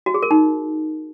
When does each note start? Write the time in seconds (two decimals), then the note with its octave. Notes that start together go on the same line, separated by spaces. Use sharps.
0.06 F#4
0.14 G#4
0.22 A#4
0.31 D#4